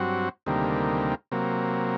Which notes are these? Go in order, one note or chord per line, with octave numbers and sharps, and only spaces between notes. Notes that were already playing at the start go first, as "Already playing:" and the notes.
Already playing: G2 F#3 C4 F#4
D2 C3 D#3 G3 A#3
C3 F#3 A#3